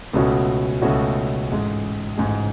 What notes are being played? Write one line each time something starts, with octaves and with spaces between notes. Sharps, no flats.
C#2 B2 A3 C#4 F#4
C#2 B2 A3 C#4 F#4
A1 G#2 G#3
A1 G#2 G#3